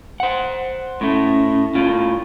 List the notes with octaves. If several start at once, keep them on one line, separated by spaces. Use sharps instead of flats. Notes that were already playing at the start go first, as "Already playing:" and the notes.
C5 F#5
A2 A3 C#4
A2 F4